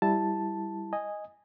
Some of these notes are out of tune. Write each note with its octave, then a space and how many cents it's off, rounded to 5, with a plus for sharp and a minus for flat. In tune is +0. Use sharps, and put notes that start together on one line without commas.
G3 +10 E4 +0 A5 +0
D#5 +0 G#5 -10